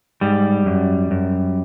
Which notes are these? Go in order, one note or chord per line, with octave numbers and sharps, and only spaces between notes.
G#2 G3
F#2
F#2